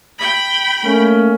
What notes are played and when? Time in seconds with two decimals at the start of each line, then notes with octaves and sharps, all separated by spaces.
0.19 G5 B5
0.84 A3 A#3 C#4